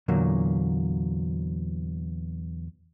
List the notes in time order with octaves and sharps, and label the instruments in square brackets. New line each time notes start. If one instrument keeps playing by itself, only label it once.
[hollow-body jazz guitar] E2 A#2 D3 F#3 A#3